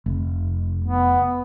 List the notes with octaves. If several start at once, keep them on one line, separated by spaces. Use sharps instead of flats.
F1
B3